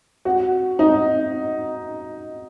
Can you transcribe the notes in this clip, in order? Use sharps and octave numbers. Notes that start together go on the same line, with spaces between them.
F#4
D#4